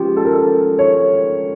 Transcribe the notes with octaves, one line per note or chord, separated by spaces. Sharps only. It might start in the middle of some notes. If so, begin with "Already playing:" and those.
Already playing: C#2 C#3 F3 G4
A4
A#4
A4
C#5